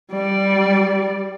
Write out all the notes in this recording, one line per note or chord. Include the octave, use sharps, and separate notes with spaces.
G3 D5